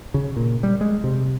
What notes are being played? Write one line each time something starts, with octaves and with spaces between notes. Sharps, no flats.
C#3
A#2
G3
G#3
C3